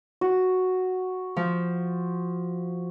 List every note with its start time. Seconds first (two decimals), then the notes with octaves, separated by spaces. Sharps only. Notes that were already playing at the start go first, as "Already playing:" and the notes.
0.21 F#4
1.37 F3